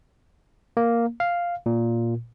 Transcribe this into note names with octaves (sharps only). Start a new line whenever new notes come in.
A#3
F5
A#2